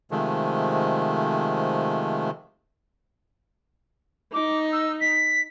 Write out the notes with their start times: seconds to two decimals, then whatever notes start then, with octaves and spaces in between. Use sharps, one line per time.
0.11 C3 D#3 F3 G#3 A3
4.33 D#4 D6
4.72 E6
5.00 B6